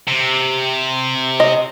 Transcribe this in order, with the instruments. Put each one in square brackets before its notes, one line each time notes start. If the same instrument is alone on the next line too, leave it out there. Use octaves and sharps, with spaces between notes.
[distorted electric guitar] C3
[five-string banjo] D#5